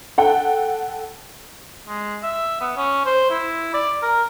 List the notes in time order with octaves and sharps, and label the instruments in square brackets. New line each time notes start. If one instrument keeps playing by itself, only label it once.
[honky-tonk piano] A4 F#5 G5
[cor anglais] G#3
E5
B3
C#4
C5
E4
D5
A#4